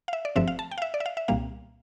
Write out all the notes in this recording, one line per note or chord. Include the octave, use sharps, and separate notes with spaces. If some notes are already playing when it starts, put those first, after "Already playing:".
F5
E5
D5
G1 G2 F3 A3 C4 E5
F5
A5
G5
F5
E5
D5
E5
F5
E5
C2 A#2 G3 A#3 F5